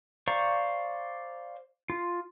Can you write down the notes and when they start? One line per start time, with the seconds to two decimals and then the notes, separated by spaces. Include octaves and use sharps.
0.28 C5 D5 F5 A#5 C#6
1.90 F4